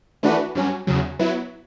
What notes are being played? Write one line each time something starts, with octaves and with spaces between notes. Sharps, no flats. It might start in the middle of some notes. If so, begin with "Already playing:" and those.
E3 A3 D4 F#4 B4
G2 F#3 C#4
E2 C#3 F#3
F#3 B3 E4